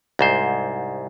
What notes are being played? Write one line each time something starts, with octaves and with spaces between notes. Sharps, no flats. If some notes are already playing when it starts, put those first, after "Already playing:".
C2 G#2 C5